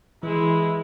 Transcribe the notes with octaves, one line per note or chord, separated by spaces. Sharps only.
E3 G#3 E4